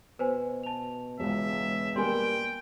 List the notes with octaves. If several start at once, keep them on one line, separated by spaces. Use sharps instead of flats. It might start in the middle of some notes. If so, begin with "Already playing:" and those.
B2 B4 C5 G#5
A5 F7
E1 C#2 B2 E5
G3 A#3 G5 G#5 C6